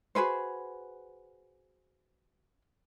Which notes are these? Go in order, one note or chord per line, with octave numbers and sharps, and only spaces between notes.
F#4 G#4 B4 C5